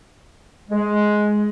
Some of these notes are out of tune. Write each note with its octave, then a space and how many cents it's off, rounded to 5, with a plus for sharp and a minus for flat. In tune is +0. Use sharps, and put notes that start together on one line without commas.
G#3 +10